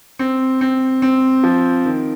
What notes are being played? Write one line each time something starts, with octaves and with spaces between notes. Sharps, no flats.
C4
C4
C4
F3
D#3